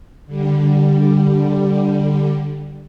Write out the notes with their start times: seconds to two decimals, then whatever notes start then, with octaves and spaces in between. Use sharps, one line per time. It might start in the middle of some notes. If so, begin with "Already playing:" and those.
0.26 D3 G3